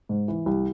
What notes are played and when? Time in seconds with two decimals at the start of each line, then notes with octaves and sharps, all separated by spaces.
0.09 G#2
0.28 E3
0.46 C2